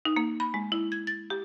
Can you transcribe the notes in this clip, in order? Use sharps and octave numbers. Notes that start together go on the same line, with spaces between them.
D#4
A#3
B5
G#3
E4
G#6
A6
G4